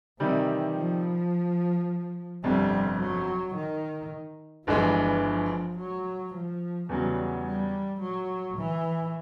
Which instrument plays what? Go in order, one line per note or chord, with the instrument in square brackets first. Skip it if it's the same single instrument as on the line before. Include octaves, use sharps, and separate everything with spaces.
[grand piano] C3 D#3 G3 [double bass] E3
[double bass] F3
[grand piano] G1 F2 C3 [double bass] G3
[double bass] F#3
D#3
[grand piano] G1 G2 E3 G#3 [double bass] F3
[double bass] F3
F#3
F3
[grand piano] E2 C#3 F#3 [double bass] G3
[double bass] G3
F#3
E3